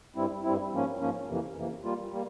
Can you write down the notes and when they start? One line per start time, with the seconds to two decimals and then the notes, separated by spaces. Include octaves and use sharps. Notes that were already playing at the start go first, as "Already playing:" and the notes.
0.16 G2 G3 C4 E4
0.44 G2 G3 C4 E4
0.72 G#2 F3 A#3 C#4
1.00 G#2 F3 A#3 C#4
1.28 F2 C3 E3 A#3
1.55 F2 C3 E3 A#3
1.84 G3 A#3 F4
2.12 G3 A#3